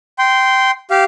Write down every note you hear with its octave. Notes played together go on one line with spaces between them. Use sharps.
G5 C6
G4 F5